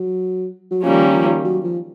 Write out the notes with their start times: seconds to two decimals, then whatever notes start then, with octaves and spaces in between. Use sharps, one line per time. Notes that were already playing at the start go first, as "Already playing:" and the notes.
Already playing: F#3
0.71 F#3
0.83 D#3 F3 G3 A#3 C#4
1.13 F3
1.44 F#3
1.64 F3